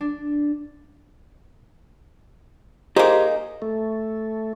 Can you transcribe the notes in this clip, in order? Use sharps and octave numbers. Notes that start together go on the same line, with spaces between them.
D4
A#3 D#4 G4 G#4 C5
A3